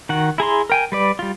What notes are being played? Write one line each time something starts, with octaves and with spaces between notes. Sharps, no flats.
D#3 F#4 F#5
E4 G#4 A#5 C6
A#4 G5 G#5
G3 B4 D5
G3 F4